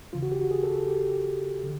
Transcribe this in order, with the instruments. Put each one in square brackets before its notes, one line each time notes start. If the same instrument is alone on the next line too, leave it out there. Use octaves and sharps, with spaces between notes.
[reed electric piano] D#2 C#3 E3 F4
F#4
G4
F#4
G#4
A4
A4
G4
D3